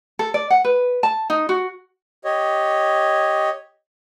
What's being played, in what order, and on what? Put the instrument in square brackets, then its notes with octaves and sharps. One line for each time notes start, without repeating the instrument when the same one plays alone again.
[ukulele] A4
D5
F#5
B4
A5
D#4
F#4
[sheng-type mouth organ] G4 C#5 D#5